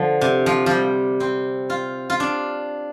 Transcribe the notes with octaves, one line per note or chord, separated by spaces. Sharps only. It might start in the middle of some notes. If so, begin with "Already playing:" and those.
Already playing: D3 F3
C3
F3
F3 G3
C4
F4
F4
D4